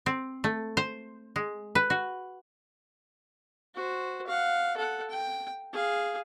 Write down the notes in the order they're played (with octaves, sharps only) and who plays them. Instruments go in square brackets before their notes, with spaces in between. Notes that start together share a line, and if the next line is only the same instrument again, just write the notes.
[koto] C4
A3
C5
G#3
B4
F#4
[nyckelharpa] F#4 C5
F5 F#5
A4 F#5
G5
G#4 F5